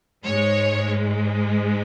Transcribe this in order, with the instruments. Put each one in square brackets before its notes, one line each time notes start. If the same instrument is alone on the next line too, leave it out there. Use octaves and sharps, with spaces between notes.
[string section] G#2 G#3 C#5